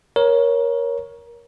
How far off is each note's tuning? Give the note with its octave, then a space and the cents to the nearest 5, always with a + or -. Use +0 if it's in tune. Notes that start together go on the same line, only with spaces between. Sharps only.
A#4 +20 C#5 +0